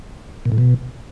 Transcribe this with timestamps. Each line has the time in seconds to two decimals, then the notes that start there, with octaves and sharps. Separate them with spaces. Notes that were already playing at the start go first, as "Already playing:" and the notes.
0.45 A#2
0.52 A2
0.58 B2